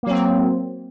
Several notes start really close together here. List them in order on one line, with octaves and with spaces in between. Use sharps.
A#3 F#3 C4